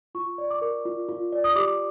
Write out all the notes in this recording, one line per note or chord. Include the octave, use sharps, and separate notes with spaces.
F4 C#6
D5
D6
A#4
F4
F4
D5
D#6
G4 D6